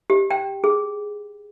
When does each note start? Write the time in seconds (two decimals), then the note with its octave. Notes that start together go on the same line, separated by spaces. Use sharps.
0.10 G4
0.30 G5
0.64 G#4